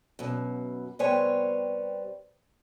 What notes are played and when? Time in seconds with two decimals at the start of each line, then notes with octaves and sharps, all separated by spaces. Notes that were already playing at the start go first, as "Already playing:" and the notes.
0.19 F#2 B2
0.99 C3 G3 B3 C5 C#5 G#5